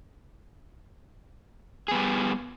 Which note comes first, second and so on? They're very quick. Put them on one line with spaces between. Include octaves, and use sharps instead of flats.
G#4 B3 G3